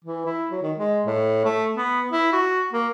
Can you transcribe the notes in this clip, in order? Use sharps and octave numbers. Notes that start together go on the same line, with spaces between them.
E3
E4
F#3
D#3
G#3
A2
A3
B3
E4
F#4
A#3